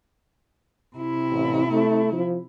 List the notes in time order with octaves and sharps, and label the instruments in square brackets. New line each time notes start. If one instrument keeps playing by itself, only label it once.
[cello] C3 E4
[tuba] A1
A3
F3